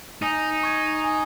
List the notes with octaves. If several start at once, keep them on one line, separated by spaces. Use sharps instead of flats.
D#4 G#5
C#6 G#6 D#7
G#5